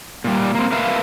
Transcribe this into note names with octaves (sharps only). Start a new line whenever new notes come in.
A#2 G3
A#3 C4
A#4 B4 E5 F5